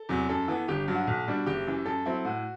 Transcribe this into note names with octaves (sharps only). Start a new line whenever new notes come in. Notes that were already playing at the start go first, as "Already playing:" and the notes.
Already playing: A4
E2 C3 F#3
F#2 A4
E3 B3
G1 G4
G2 F#3
F#4
B1
B2 G3 D4
F#1 G4
F#2 E3
F#2 A4
F#3 C4 E4
A2 F#4